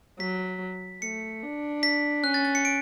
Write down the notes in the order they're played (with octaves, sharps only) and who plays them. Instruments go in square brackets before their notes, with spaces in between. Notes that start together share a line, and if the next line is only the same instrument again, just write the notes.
[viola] F#3 [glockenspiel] B6
[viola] A3 [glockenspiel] C#7
[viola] D4
[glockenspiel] B6
[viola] C#4 [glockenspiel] F#6
[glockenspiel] A6
A6
C#7
D7